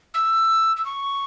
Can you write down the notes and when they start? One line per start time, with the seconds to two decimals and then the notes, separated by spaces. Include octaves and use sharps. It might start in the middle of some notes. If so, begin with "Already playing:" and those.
0.14 E6
0.77 E6
0.85 C#6